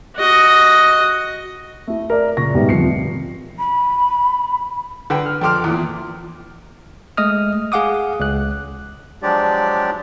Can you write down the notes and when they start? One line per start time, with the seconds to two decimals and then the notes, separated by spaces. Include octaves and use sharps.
0.16 F#4 D#5
1.88 A3 E4
2.10 A#4 D5
2.37 F#1 A#2 C#6 A#6
2.54 G#2 B2 G3 A3
2.69 D1 F2 F3 C7 C#7
3.59 B5
5.10 D3 B4 F#5 G5
5.26 F6
5.41 F2 A4 G5 C6 D6 F6
5.64 E2 A#2
7.17 G#3 A3 D#5 D#6 F6
7.72 G#4 F5 F#5 D6 D#6
8.20 C#2 F#6
9.22 F3 F#3 G#3 D4 G4 D5